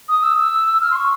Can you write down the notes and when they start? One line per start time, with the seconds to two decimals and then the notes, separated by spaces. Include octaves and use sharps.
0.09 D#6
0.23 E6
0.37 E6
0.81 F6
0.91 C6
0.95 C#6